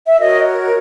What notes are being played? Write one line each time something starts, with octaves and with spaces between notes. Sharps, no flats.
E5
F#4 A#4 C#5 D#5